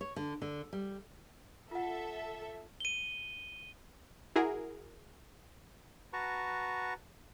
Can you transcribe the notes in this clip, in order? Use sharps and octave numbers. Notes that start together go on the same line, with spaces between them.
C#5
D3
D3
G3
F4 A4 E5 F#5
D#7 G7
E4 F#4 G#4 A#4
F#4 B4 A5 A#5 C#6